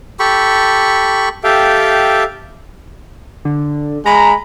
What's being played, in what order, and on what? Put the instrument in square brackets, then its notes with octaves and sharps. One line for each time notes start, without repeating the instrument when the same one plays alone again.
[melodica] G4 A4 B5 C#6
[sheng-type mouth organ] G4 A4 E5 F5 G5
[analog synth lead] D3
[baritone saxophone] G#3 [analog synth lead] A#5 [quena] B5